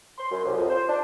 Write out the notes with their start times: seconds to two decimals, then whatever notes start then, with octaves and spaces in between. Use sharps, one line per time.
0.18 C6
0.31 F#2
0.45 C2
0.57 F2
0.70 C5
0.88 D4